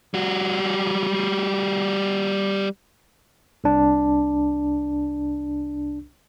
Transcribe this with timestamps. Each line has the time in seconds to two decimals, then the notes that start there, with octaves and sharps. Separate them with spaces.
0.14 G3 F#4
3.64 C2 D4